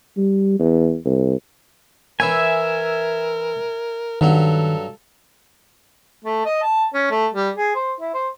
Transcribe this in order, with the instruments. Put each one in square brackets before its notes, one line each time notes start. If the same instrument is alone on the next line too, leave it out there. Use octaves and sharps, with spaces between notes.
[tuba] G3
E2
C2
[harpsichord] E3 E4 C#5 [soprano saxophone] A#4 [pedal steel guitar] E5 G#5
[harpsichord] G2 F#3 F#5 [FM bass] D#3 [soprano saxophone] A4
[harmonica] A3
D#5
A5
C#4
A3
G3
G#4
C5
E4
C5